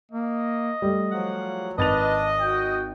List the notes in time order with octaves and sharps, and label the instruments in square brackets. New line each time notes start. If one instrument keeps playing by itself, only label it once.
[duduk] A#3 [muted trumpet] D#5
[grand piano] G3 A3
[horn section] F3 F#5 [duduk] F#3
[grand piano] G#1 A6 F7 [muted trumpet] D4 [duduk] B4 [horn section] D#5
[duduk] F#4 [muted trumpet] G5